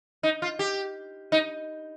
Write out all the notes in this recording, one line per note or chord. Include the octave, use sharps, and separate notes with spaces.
D#4
F4
G4
D#4